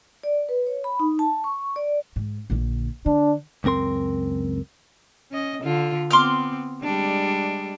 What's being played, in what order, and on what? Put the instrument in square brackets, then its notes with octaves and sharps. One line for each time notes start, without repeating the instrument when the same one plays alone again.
[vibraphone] D5
B4
C#5
B5
D#4
A5
C#6
D5
[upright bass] G#2
A#1 D3
[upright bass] D3 [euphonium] D4
[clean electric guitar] C#2 F#2 C4 A#4 C6
[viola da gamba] C#4 D#5
D3 F4
[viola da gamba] B3 C4 [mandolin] C6 D6 F6
[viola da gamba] G3 G#3 D4